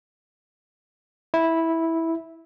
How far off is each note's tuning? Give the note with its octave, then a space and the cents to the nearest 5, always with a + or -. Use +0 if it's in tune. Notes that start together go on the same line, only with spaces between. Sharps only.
E4 -10